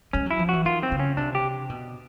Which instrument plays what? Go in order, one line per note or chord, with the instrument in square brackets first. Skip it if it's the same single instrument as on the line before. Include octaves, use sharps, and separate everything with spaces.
[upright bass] G#3 [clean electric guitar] C#4
[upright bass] F#3 [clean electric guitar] E4
[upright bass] F3
[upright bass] E3 [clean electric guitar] F#4
[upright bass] D#3 [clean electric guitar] F4
[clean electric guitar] C4
[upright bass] C#3
[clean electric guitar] C#4
[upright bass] C3 [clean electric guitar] D4
[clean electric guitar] G4
[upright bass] B2